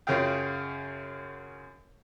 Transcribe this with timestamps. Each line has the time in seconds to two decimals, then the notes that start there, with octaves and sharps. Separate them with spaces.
0.07 F#2 C#3 F4 F5 G5